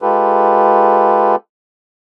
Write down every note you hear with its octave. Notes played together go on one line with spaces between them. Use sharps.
G#3 F4 G4 A4 B4